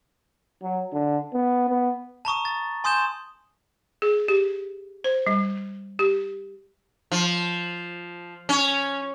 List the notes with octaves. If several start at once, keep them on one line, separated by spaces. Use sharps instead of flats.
F#3
D3
B3
B3
A5 A#5 C#6 D#6
A6
G#5 C6 D#6 G6 E7 G7
G#4
G4
C5
G3
G4
F3
C#4